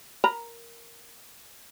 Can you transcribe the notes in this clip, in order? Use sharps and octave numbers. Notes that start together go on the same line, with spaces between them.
A#4 A#5 B5